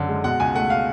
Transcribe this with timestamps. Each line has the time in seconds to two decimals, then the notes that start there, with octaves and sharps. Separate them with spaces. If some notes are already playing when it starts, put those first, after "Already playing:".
Already playing: F#1 F#2 D3
0.09 G#3
0.24 B2 F#5
0.40 C#2 G#5
0.55 A3 F#5
0.70 F5